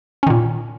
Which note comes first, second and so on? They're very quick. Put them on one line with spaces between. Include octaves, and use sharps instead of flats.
C#4 D#3 A#2